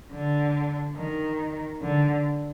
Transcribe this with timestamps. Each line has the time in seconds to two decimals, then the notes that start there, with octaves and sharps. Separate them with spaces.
0.12 D3
0.96 D#3
1.82 D3